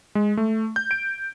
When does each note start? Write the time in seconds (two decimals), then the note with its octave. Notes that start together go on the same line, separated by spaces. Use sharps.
0.15 G#3
0.37 A3
0.76 G6
0.91 D7